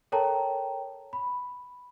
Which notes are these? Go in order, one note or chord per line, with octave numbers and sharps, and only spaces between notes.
A4 A#4 C#5 G5 A5 A#5
B5